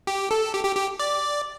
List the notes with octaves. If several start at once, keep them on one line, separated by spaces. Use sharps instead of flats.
G4
A4
G4
G4
G4
D5